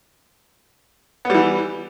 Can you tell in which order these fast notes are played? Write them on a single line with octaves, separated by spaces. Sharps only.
B3 G3 E3